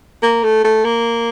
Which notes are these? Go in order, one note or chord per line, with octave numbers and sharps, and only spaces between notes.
A#3
A3
A3
A#3